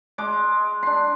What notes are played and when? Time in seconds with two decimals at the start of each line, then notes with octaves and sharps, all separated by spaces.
0.18 G#3 D6
0.83 D4 C6